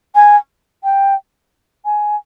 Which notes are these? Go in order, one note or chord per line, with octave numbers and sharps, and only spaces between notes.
G#5
G5
G#5